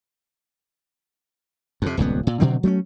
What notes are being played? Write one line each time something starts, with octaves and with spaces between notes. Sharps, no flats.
F2 C3
D#1 C#2 G2 B3
A#2
B2 D3 F#3 C4
F#3 A3 A#3 C#4